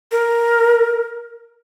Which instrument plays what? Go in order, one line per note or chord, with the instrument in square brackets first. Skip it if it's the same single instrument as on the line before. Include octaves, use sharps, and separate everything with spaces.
[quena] A#4